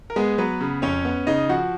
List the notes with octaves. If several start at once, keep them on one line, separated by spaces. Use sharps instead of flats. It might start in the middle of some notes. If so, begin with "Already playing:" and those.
A#4
G#3 B3 G#4
F#3 B3 B4
C#3
F2 C#4 C#5
B3
C#3 D#4 D#5
F3 F#4 F#5